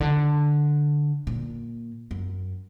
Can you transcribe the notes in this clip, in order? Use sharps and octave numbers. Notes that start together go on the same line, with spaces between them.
D3
A#2
F#2